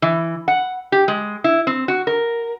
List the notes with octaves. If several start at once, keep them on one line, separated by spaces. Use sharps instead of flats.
E3
F#5
G4
G#3
E4
C4
F#4
A#4